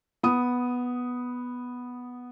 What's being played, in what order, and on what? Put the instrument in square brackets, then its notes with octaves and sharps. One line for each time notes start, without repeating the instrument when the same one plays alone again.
[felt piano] B3 D#6